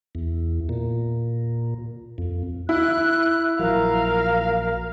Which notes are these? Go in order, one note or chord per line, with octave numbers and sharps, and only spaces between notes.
E2
A#2
F2
E4 F#6
A#1 F3 F#3 A#4 F5